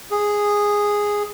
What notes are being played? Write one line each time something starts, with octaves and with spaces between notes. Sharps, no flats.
G#4